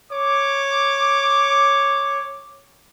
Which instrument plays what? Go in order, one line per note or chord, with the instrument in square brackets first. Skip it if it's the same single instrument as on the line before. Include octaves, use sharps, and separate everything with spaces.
[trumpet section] C#5 D6